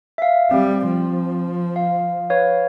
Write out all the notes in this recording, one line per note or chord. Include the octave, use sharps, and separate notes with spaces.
E5 F5
G3 C4
F3
F5
B4 C#5 F5